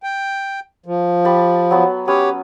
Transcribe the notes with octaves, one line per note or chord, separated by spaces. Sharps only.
G5
F3
G4 A5 B5
F#3 B3
C#4 G4 B4 C#5 D#6